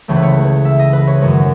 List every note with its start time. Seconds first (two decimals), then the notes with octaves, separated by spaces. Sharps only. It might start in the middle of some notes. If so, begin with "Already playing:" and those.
0.08 C#2 C#3 E3 A3 C#5
0.16 B4
0.23 C#5
0.65 E5
0.79 D#5
0.93 B4
1.08 C#5
1.21 F#2 D#3 G#3 C#5